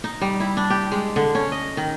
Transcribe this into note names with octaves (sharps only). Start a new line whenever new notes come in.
D#4
G3
E4
D4
G4
G#3
D3
C#4
D#5
D#3